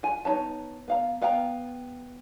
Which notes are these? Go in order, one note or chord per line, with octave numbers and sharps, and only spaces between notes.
F4 G#5
B3 D#4 C#5 A5
B3 F5 A#5
B3 F5 G5 A#5